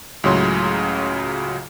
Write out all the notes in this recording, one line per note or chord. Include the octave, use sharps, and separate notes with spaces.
C#2 A2 C#3 F#3 C6